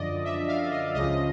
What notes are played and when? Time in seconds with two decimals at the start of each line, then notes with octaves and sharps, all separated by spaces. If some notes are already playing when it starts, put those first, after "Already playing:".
Already playing: F#2 D3 F3 D5 D#5
0.24 E5
0.48 F5
0.71 D#5
0.94 C#2 C#3 F3 D#5